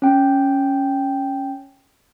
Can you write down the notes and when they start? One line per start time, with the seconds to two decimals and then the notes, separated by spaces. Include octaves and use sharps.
0.02 C#4 G5